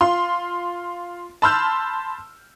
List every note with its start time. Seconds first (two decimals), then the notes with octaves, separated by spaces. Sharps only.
0.01 F4 C6
1.42 A5 B5 C6 E6 F6 G6